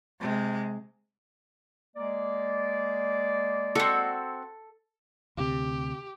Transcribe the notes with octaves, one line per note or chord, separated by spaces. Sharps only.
C3 G#3
G#3 A#3 D5
C4 F#4 A4
D2 C3 G4